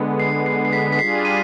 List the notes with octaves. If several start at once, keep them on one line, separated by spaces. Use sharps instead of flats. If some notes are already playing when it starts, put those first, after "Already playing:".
Already playing: D3 G#3 B3
C7
C7
C7
B6
B6
G3 D4 F4 G#4 C7
D#7